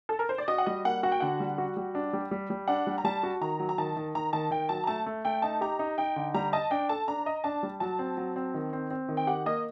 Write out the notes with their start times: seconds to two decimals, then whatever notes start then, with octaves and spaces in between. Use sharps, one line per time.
0.09 A4
0.19 A#4
0.29 C5
0.38 D5
0.48 F#4 D#5
0.58 F#5
0.66 G3 D#5
0.85 A#3 F#5
1.03 F#4 F#5
1.12 G5
1.20 D3 F#5
1.40 G3
1.58 F#4
1.77 G3
1.95 D4
2.13 G3
2.31 G3
2.50 G3
2.68 D4 F#5
2.87 G3
2.98 A#5
3.04 G3 A5
3.23 F#4
3.41 D#3 A#5
3.59 F#3
3.69 A#5
3.78 D#3 A5
3.97 D#3
4.15 D#3 A#5
4.33 D#3 A5
4.51 D#3 G5
4.69 F#3 A5
4.84 A#5
4.87 A3 A5
5.06 A3
5.25 A3 G5
5.42 D#4 A5
5.61 G4 A#5
5.79 D#4
5.98 D#4 G5
6.16 D3
6.34 G3 A#5
6.53 D#5 A5
6.71 D4 G5
6.89 A4 A5
7.08 D4 A#5
7.26 D#5
7.44 D4 A5
7.63 G3
7.80 F#3 A5
7.99 C4
8.17 F#3
8.36 C4
8.54 D#3
8.73 C4
8.90 C4
9.09 D#3
9.17 G5
9.27 G4 F#5
9.46 A#3 D#5